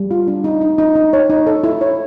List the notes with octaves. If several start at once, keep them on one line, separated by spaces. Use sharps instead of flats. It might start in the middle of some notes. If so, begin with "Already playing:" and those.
Already playing: G3
F4
D4
D#4
D#4
D#4
D#4
C#5
D#4
A4
E4
C#5